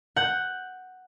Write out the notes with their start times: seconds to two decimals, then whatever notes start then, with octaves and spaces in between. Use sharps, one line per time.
0.16 F#5 G6